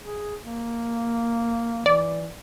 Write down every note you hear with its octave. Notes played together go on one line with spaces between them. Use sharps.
G#4
A#3
E3 D5